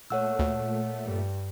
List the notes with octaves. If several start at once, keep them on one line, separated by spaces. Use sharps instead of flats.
A#2 A3 C#5 F#5 E6
D2
G2